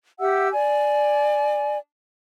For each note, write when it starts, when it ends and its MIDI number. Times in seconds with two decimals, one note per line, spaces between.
0.20 0.48 67
0.20 0.48 76
0.20 0.48 78
0.20 0.48 88
0.52 1.77 74
0.52 1.77 80